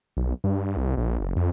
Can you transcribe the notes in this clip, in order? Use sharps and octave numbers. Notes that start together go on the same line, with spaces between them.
B1
G2
C2
A#1
F#1
F2